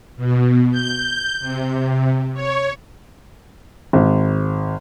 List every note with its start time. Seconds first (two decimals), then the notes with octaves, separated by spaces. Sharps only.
0.16 B2
0.71 G6
1.40 C3
2.34 C#5
3.93 G#1